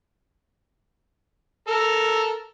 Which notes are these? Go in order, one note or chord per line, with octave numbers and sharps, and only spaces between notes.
A4 A#4